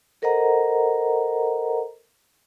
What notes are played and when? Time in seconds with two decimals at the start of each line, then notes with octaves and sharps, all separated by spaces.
0.22 A4 A#4 C5 D#5 F#5 A#5